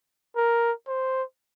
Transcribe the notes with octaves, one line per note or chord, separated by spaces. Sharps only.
A#4
C5